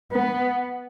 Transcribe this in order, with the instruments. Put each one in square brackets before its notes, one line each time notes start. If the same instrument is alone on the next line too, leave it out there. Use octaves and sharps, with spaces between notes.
[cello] B3